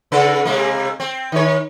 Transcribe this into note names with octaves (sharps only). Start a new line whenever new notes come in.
C#3 A4 B4
C3 G#3 A#3
C4
D#3 C#5